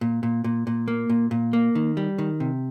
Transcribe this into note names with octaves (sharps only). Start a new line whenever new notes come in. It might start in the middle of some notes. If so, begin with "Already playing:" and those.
A#2
A#2
A#2
A#2
A#3
A#2
A#2
A#3
D#3
G3
D#3
C3